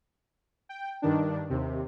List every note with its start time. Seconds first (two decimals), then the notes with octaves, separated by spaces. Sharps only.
0.69 G5
1.02 G2 D#3 D4
1.50 D#2 C3